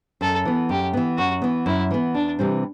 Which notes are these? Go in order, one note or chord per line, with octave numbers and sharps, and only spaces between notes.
F#2 A4
E3 B3
F#2 G4
E3 B3
F#2 F#4
E3 B3
F#2 E4
E3 B3
E2 D4
C3 E3 G3 C4